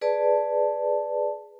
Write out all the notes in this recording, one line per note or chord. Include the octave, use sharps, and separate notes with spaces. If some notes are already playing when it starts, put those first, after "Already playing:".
G#4 B4 D5 A5